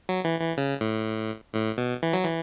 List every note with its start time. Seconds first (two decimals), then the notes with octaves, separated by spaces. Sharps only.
0.09 F#3
0.25 E3
0.41 E3
0.57 C#3
0.81 A2
1.54 A2
1.77 B2
2.03 E3
2.13 F#3
2.24 E3